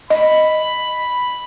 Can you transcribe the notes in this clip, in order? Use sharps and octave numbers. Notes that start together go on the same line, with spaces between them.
D#5 B5